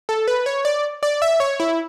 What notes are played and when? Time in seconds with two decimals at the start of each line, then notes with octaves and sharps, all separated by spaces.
0.09 A4
0.28 B4
0.46 C#5
0.65 D5
1.03 D5
1.22 E5
1.40 C#5
1.60 E4